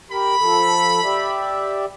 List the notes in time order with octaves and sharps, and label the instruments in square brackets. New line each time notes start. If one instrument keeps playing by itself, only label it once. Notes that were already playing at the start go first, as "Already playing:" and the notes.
[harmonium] G4 A#4 [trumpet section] B5
[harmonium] F3 A4
G4 D5 E5